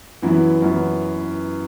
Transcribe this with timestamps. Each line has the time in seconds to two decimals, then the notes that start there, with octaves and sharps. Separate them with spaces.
0.22 F#2 E3 B3 E4
0.62 F#2 E3 B3 E4